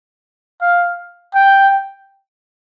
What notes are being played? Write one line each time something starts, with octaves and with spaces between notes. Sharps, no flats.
F5
G5